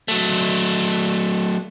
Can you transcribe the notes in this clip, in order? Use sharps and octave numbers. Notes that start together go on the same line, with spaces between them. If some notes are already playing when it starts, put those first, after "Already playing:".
F#3 A3